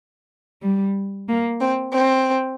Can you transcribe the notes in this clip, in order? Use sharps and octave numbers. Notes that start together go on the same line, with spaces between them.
G3
A#3
C4
C4